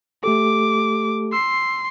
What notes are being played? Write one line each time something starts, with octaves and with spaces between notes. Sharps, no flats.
A3 G4 A4 D6
C6 E6 C7